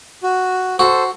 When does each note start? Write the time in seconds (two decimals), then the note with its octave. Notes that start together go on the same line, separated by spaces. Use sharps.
0.23 F#4
0.79 F#4 A4 C5